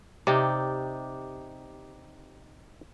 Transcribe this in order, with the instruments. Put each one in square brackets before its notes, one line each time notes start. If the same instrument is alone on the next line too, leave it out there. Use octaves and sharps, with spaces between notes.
[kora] C3 [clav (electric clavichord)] D#4 G4 D5